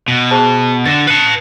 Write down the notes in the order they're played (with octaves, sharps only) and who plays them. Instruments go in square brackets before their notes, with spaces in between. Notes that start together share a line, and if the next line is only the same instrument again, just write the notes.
[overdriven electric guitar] B2
[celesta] G#4 C5 A5
[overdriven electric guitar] D3 [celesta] A6 A#6 E7
[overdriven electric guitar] B4 A5 [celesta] C7 C#7